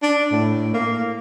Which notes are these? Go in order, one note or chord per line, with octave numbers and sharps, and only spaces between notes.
D4
A2
A#3